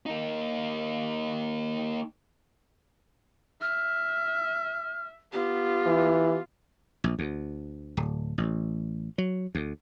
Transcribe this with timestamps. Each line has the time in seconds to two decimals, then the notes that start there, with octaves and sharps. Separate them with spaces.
0.06 A#3 D#4
3.61 E5 F6
5.32 B3 F4 G4
5.86 E3
7.04 A#1
7.19 D2
7.97 D1
8.38 A1
9.18 F#3
9.55 D2